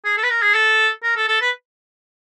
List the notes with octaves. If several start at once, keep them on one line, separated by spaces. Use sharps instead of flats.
G#4
A4
B4
A#4
G#4
A4
A#4
A4
A4
B4